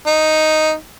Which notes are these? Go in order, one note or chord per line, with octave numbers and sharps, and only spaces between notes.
D#4